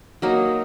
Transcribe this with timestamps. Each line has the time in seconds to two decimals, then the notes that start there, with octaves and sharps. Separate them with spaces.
0.22 F#3 A#3 D#4